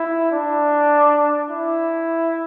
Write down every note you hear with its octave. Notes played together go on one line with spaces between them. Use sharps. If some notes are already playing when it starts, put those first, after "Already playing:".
Already playing: E4
D4
E4